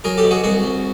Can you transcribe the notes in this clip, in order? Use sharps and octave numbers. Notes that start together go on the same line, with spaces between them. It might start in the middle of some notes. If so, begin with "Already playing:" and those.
F#3 G#4 A#4
G4 A4
B2
F#4 G#4
C2 F#4 G#4
C2